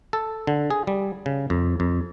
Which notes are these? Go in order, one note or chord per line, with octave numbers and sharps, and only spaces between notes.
A4
D3
G#4
G3
C#3
F2
F2